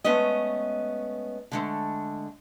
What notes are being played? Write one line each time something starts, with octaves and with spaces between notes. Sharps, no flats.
G#3 A3 B3 C#4 D#5
D3 G#3 A3